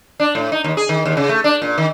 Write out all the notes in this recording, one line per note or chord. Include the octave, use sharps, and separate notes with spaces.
D4
A2
D#4
D#2
G#4
D#3
D#2
C#3
A3
D4
A#2
D#3